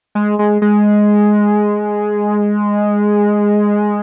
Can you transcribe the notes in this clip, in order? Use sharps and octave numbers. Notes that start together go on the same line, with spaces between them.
G#3
G#3
G#3